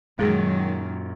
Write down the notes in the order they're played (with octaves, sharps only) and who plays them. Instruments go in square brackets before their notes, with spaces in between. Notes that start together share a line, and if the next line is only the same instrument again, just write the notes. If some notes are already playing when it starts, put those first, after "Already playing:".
[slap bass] F#2 A#2 [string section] D#3 F#3 [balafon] G#3 G#4